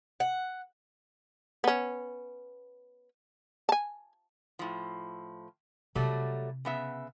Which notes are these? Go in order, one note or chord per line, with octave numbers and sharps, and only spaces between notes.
F#5
B3 C#4
G#5 A5
A2 F3
C3 F#3 G3 A3 E4
C#3 B3 E5